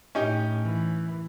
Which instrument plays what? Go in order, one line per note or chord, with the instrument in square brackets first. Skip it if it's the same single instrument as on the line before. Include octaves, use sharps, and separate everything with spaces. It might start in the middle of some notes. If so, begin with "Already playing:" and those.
[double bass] A2 [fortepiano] C#4 D#4 G4
[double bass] E3